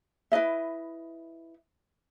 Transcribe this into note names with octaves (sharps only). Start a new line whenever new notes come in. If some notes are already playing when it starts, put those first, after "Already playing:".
E4 B4 D#5 E5